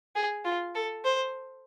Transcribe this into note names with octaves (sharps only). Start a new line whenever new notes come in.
G#4
F4
A4
C5